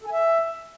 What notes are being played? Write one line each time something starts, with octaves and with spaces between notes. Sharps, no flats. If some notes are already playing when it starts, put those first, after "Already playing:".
A4
G#5
E5